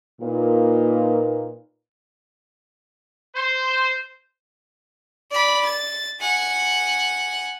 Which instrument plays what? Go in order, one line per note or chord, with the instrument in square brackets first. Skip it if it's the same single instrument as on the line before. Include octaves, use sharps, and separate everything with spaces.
[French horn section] A#2 A#3 D#4 F4 B4
[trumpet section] C5
[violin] D5 B5
A6
F#5 G#5